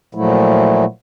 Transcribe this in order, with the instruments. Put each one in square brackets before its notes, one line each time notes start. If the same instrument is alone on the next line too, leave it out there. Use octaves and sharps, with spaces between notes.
[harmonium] A#2 F3 F#3 A3 E4